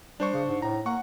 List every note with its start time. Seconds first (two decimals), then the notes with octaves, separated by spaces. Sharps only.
0.20 G3 D4 C5 C#6
0.33 C#3
0.48 G#2
0.62 A2 A#5
0.86 A#3 F#5 C#6